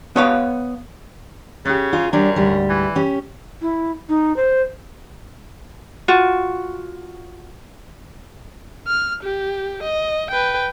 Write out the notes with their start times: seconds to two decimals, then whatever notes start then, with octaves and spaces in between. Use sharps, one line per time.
0.16 B3 C#5 F5
1.65 C#3 C#4 G4
1.93 F4 G#4 F5
2.13 F#2 G3 D4
2.36 D2 G#2 G3
2.70 E3
2.95 C#4 G4
3.62 E4
4.09 D#4
4.36 C5
6.08 F4 F#4
8.87 F6
9.24 G4
9.84 D#5
10.31 B4 G5